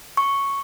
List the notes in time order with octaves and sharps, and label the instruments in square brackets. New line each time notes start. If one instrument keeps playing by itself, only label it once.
[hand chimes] C#6